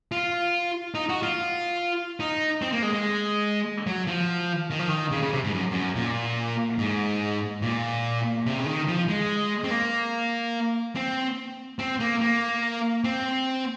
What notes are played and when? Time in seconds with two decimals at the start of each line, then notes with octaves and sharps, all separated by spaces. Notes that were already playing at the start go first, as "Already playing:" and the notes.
0.12 F4
0.95 D#4
1.09 F#4
1.23 F4
2.20 D#4
2.62 C4
2.72 A#3
2.82 G#3
2.93 G#3
3.87 F#3
4.07 F3
4.70 D#3
4.79 F3
4.89 D#3
5.12 C#3
5.22 C#3
5.32 C3
5.44 G#2
5.54 F#2
5.71 F#2
5.96 A#2
6.78 G#2
7.62 A#2
8.46 C3
8.57 C#3
8.66 D#3
8.88 F3
9.09 G#3
9.64 C4
9.71 A#3
10.96 C4
11.79 C4
12.00 A#3
12.21 A#3
13.04 C4